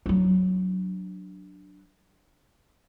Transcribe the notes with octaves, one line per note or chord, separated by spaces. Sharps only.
F#3 D4